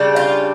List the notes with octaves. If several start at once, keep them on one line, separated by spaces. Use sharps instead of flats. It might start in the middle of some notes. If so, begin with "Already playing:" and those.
Already playing: C#3 G3 D4
F4